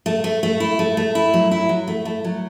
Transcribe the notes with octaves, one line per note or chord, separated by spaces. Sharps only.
A3
A3
A3
E4
A3
A3
E4
F#3
E4
F#3
A3
A3
F#3